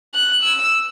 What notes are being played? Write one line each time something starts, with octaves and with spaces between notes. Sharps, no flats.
F#6
E6